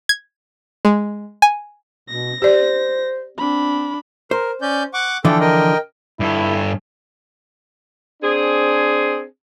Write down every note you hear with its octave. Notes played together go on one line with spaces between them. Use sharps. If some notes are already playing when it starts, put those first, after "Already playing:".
G#6
G#3
G#5
B2 A#6
G4 C5 D5
C4 D4 B5
A#4 C5
C#4 D5 G6
F#5 C#6 D6
D3 E3 F3 A4 G5
A#4 D#5 G5
G2 E4 A4
C4 D4 G#4